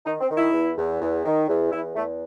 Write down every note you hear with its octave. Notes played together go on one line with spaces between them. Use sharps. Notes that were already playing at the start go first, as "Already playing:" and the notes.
D#3 D#4
C4
D#3
E4
E2
E2
E2
D#3
E2
E2 E4
E2 A3